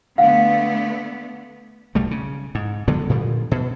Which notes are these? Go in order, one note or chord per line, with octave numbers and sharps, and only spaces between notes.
D3 A3 B3 F5 F#5
B1 G3 A3
C#3
G#2
D3 F#3 G#3 B3
A#2 D3 F3 G3
B2